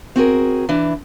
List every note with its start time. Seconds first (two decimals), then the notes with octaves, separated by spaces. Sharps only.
0.16 C4 F#4 G#4 A#4
0.69 E3 D4